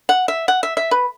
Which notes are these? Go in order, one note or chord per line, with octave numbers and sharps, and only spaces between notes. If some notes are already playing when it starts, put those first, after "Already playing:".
F#5
E5
F#5
E5
E5
B4